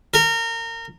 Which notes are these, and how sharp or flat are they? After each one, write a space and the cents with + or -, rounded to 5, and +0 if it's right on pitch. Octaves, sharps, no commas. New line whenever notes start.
A#4 -25